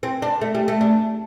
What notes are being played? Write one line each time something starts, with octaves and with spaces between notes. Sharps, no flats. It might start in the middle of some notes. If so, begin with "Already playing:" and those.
C4
D4
A3
G3
A3
D4